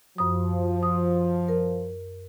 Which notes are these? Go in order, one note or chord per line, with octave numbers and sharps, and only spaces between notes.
F#2 F3 D#6
D#6
A#4